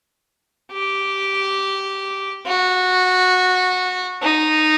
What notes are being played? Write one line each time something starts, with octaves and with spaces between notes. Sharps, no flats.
G4
F#4
D#4